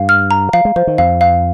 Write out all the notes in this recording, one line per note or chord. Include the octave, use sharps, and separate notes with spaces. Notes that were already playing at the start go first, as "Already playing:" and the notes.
Already playing: G2 F5
F6
A#5
F3 F5
G#3
F3 C5
D#3
F2 F5
F5